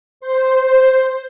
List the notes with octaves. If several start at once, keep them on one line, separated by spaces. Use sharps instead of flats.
C5